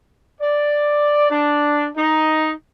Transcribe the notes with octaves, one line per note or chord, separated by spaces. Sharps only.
D5
D4
D#4